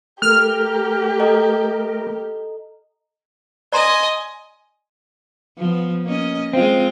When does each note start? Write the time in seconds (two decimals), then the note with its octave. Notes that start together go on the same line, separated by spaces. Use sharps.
0.22 A3 G4 A#4 F6
1.19 A4 D#5 A#5
3.72 D5 D#5 G#5 A#5 C6
5.58 F3 B3
6.04 A#3 C#4 D#5
6.53 G#3 C4 F4